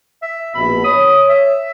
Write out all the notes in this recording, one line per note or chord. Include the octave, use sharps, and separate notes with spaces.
E5
A#1 B2 B5
C#5 D#6
E5